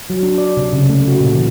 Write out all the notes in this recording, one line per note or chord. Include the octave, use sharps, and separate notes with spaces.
F#3
D4
D5
C3
C#3
A3
F#4
A#2
E3